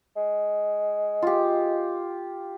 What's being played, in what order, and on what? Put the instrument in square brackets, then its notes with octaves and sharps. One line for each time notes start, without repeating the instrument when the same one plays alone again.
[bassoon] G#3
[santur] F4 G4